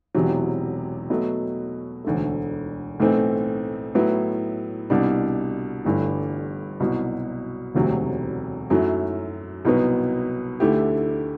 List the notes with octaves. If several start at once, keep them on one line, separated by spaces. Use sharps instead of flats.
E1 E2 C3 F#3
B2 F#3 A3
E1 D2 D3 A3
B1 A2 E3 A3 C4
A2 F#3 B3 E4
C2 B2 G3 D4
G1 G2 E3 A3
C2 B2 F#3
E1 D2 C3 F#3
F#2 F#3 A3 E4
C2 B2 F#3 B3
D2 D3 A3 E4 G4